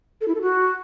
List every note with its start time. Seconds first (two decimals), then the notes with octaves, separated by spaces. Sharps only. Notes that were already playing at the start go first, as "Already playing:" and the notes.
0.21 A4
0.28 E4
0.35 A4
0.42 F#4